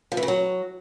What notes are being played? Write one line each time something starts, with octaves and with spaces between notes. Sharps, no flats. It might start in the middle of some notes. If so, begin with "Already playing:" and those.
F3
E3
C#3
F#3